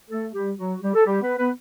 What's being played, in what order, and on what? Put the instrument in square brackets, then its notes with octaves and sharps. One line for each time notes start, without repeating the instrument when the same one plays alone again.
[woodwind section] A3 A4
G3 G4
F#3 F#4
G3 G4
A4
G3 G4
B3 B4
B3 B4